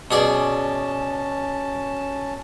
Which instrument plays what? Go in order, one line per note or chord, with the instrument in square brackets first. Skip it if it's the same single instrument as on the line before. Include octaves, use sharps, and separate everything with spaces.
[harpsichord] B2 G#4 D5 [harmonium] C#4 A5